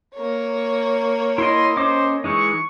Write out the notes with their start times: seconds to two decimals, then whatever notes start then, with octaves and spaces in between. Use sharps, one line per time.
0.15 A#3 C#5
1.38 E4 D#5 C6
1.77 C#4 C5 D#5 D6
2.24 E3 G#3 D#4 C#6